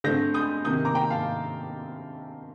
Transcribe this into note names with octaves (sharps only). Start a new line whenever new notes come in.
D3 A3 C4 G6 A#6
D#6 G6
C3 D#3 A#3 D#6 G6
A#5 D6
G5 A#5
F5 A5